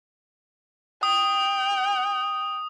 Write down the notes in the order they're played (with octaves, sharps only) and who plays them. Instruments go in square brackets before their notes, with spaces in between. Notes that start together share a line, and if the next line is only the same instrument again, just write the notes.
[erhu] G5 [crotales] D#6